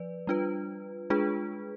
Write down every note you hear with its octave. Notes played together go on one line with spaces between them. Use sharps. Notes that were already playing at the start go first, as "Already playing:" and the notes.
Already playing: F3 B4 D5
G3 D4 F4 B4
G#3 D4 F4 G#4 B4